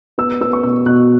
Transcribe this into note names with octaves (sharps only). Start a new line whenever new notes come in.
B3 E6
B3 E6
C#6
B2 E6
B2 F#6